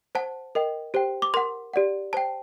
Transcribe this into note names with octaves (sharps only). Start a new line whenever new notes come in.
C5 F#5 A5
A#4 D#5 G5
G4 C5 G5
D6
A#4 F#5 C6
G4 D5 F#5
C5 G5 A5